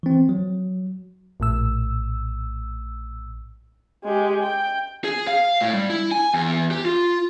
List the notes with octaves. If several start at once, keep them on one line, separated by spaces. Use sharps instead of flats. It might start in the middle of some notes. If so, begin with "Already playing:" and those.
E3 C4
F#3
A#1 A2 E6
G#3 G4
G5
G#4
F5
A2
G3
E4
G#5
E2
G4
F4